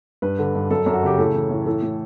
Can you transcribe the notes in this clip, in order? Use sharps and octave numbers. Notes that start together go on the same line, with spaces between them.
G2 B4
D3
G2
F#2 A4
F#2
F#4
C#3 G4
A2 A4
E3
A2
E3 A4
A2